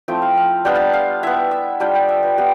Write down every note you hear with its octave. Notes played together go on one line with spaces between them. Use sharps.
F3 A3 C4 E4 G5
F5
F5
G3 B3 D4 F4 G5
A5
F5
B3 E4 E5
E5
G3 D4 F4 G5
G5
E5
B4
B3 F4 G4